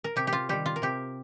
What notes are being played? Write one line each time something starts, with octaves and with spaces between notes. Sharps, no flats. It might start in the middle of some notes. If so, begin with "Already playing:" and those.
A#4
C3 G4
G4
F4
D#3 G3 G4
F4
A#4
C3 G4